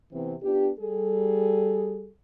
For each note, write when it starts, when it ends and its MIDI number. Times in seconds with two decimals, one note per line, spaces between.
0.12 0.35 48
0.12 0.35 52
0.12 0.35 59
0.12 0.35 60
0.43 0.69 59
0.43 0.69 62
0.43 0.69 65
0.43 0.69 67
0.80 2.09 55
0.80 2.09 68
0.80 2.09 69